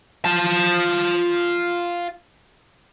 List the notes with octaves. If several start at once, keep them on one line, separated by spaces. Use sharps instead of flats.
F4 A5